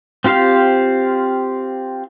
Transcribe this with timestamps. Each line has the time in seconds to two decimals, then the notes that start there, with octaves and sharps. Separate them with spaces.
0.24 C4 F4 G4 C5 F5